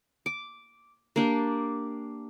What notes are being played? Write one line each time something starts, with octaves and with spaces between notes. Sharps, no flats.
D6
A#3 D4 G4